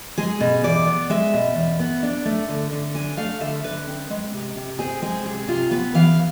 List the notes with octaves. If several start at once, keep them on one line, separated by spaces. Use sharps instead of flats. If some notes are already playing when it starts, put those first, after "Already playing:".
G#3 G#4
B2
E2 D5
B3
G#3 E5
B2
E2
B3
D4
A3
D3
D3
D4 G#5
A3 F5
D3 E5
D3 B4
C4
G#3
C3
C3
C4 G#4
G#3 G#4
C3 G#4
C3 F4
B3 B4
E3 F5